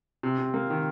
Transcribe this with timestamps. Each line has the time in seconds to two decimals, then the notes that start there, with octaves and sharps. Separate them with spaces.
0.23 C3
0.38 C3
0.54 A#3
0.70 D#3